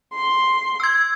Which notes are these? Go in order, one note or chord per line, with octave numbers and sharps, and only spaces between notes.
C6
E6 G#6